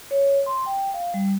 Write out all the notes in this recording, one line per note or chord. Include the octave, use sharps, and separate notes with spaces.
C#5
C6
G5
F5
G3